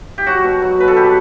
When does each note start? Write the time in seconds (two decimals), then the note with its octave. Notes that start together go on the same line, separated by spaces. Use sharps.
0.18 G4
0.26 F#3 F#4
0.44 B2
0.62 F#3
0.80 B2 B4
0.88 A4
0.97 B2 G4